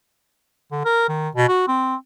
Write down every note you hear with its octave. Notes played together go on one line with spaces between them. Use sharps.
D3
A#4
D#3
B2
F#4
C4